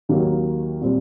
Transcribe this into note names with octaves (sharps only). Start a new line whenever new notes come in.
D#2 D#3 F#3 A#3
A#2 G3 C4